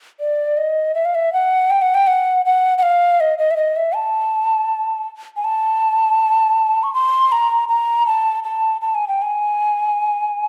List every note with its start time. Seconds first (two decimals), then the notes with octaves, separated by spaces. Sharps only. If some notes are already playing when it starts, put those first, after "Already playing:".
0.20 D5
0.57 D#5
0.95 E5
1.05 F5
1.15 E5
1.33 F#5
1.70 G5
1.82 F#5
1.94 G5
2.07 F#5
2.46 F#5
2.78 F#5
2.83 F5
3.20 D#5
3.38 D#5
3.51 E5
3.57 D#5
3.76 E5
3.95 A5
5.37 G#5
5.44 A5
6.83 C#6
6.94 C6
7.32 A#5
7.69 A#5
8.07 A5
8.44 A5
8.81 A5
8.95 G#5
9.08 G5
9.22 G#5